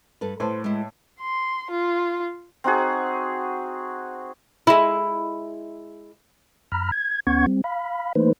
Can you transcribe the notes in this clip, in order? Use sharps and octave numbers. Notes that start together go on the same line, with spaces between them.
G2 A4 B4
A2 B4 C5 A5
G#3 E4
C6
F4
C4 D#4 F#4 G#4
G#3 E4
F#2 A#5 B5 F6
G#6
D2 B3 C#4 F#5 C#6 G#6
G3 C4
F5 B5
E3 A3 A#3 D#4 B4 C5